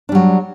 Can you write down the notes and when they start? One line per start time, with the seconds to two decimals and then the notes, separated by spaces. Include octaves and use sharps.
0.09 D4
0.12 G3
0.15 F#3